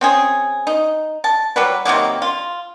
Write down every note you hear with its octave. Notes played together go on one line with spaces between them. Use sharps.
C4 C#4 G#4
D#4
A5
F#3 G3 B4
C3 D#3 F#3 A#3
F4